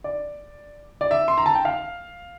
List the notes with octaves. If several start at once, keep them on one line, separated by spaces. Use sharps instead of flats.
D5
D5
E5
C6
A#5
A5
G5
F5